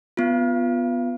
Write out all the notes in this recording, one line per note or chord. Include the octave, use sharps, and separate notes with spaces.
B3 F4